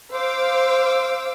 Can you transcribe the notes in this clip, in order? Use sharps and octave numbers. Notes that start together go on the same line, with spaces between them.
C5 F5 D6 E6